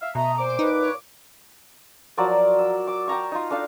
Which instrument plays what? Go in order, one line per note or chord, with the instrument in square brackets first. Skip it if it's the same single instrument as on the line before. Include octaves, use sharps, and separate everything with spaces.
[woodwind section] E5 F5
[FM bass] B2 [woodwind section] A3 D#5 [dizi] E5 [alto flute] A#5
[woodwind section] A#2 D6 [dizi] C5
[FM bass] D#4 [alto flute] B4
[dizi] C#5
[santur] F3 F#3 A#4 D5
E6
D6
G5 A5 A#5 C#6
D#4 F4
D4 A4 F5 A5